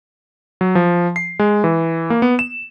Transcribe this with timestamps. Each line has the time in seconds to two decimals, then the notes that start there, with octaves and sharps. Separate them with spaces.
0.61 F#3
0.75 F3
1.16 C7
1.39 G#3
1.64 E3
2.10 A#3
2.22 B3
2.39 E7